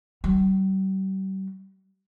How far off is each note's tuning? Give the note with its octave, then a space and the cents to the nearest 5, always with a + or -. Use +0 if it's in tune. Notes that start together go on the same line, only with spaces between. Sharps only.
G3 -40